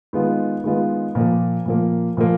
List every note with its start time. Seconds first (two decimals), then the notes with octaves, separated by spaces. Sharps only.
0.13 D#3 G#3 B3 F4
0.64 D#3 G#3 B3 F4
1.15 A#2 F3 A#3
1.66 A#2 F3 A#3
2.17 A#2 F3 A#3